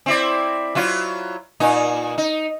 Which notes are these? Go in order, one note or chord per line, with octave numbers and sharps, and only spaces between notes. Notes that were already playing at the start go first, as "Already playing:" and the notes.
C4 E4 D5
F#3 E4 F4
A#2 D#4
D#4